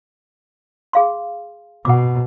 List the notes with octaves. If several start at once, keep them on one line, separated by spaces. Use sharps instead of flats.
G#4 F5 C6
B2 F#5 D6